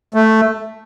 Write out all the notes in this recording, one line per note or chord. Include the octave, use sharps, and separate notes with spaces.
A3